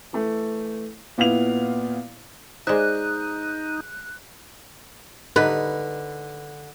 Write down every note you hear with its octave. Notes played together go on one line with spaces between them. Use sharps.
E3 A3
A#2 B3 E4 F5 F7
G#3 D#4 C5 D5 E5 F#6
D3 D#4 B4